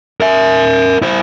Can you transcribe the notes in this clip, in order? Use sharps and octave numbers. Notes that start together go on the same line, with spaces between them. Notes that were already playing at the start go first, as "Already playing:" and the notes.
A#4 E5
E4 C5